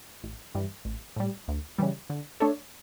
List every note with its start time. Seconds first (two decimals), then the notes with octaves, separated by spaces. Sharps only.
0.23 A1
0.55 G2 E3 G3
0.85 A1
1.16 A2 G3
1.48 D2
1.78 C#3 E3 G3
2.10 D3
2.40 A3 D4 A4 C#5